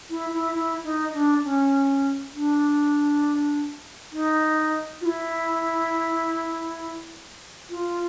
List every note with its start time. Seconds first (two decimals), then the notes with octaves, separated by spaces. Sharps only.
0.10 E4
0.32 E4
0.53 E4
0.84 D#4
1.14 D4
1.44 C#4
2.34 D4
4.12 D#4
5.01 F4
5.06 E4
7.70 F4